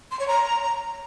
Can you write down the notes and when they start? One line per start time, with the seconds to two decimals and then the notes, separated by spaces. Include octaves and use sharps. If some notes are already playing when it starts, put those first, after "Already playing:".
0.11 C6
0.20 C#5
0.28 A#5